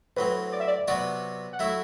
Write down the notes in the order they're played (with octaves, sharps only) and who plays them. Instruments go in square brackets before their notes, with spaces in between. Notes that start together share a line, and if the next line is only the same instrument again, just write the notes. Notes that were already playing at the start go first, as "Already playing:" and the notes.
[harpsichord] A2 F#3 C4 [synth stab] B4
[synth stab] D5
E5
D5
[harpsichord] C3 F#3 B3 F#4 B4 [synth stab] D5
[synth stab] F#5
[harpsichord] F#3 A3 E4 [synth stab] E5